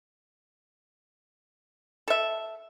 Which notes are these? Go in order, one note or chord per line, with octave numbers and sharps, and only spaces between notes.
A4 E5